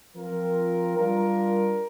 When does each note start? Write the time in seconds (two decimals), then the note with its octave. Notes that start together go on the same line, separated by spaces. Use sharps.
0.15 F3 C4 F4 A#4
0.96 G3 D4 F4 A#4